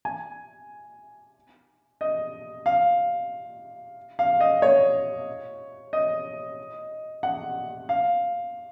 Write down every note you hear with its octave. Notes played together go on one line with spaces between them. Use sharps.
G#5
D#5
F5
F5
D#5
C#5
D#5
F#5
F5